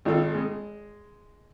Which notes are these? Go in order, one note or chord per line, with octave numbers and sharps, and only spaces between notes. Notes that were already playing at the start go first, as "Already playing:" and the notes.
G#1 F4 A4
G#3